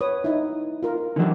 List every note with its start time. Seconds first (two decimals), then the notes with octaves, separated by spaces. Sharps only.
0.01 B4 C#5 D#6
0.24 D#4 E4
0.83 F4 A#4
1.16 D3 E3 F#3 D#4 G4